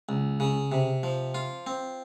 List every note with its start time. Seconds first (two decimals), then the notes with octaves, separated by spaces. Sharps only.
0.09 C#2
0.40 C#3
0.72 C3
1.03 F3
1.35 F4
1.67 C4